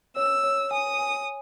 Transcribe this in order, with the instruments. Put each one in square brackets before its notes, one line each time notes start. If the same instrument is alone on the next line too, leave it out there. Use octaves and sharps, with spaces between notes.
[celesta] C#5 [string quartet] E6
[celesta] C#5
[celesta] G#5 [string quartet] D#6
[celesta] G#5